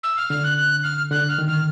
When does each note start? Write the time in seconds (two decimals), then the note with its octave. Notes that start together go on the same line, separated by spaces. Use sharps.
0.03 E6
0.17 F6
0.29 D3 F6
0.44 F#6
0.57 F#6
0.83 F6
1.11 D3 F#6
1.28 F6
1.39 D#3
1.47 F6